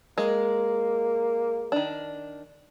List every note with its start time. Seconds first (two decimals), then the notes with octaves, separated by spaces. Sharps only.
0.18 G#3 A#3
1.72 D#3 D4